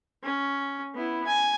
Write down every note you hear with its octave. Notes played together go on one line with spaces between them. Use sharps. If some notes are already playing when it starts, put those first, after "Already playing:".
C#4
B3 E4
G#5